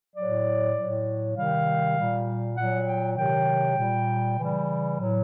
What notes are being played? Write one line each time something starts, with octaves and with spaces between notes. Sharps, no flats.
A2 F#3 D5
A2 F#3
C3 D#3 G3 F5
A#2 G3
A#2 F#3 F#5
G5
C3 D#3 F#3 G5
A#2 G3
C#3 E3 G3
A2 F#3